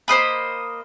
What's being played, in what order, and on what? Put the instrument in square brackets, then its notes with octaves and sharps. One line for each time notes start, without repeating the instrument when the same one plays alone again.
[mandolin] A#3 C5 D#5 B5